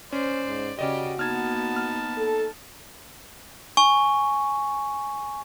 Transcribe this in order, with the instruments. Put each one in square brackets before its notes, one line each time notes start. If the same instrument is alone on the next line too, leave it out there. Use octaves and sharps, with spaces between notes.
[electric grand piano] C#4 [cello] C5 [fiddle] D5
[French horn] G#2
[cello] C#3 [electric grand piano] C#4 D5 D#5 [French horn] F#4 [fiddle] G4
[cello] A#3 B3 [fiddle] D#4 A5 [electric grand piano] F6 G#6
[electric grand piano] F6
[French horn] A4
[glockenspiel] G#5 C#6